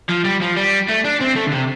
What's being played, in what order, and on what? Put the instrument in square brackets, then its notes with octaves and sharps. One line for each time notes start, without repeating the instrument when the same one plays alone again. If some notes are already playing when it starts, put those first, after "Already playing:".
[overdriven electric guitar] F3
G3
F3
G3
A3
D4
C4
A3
D3
C3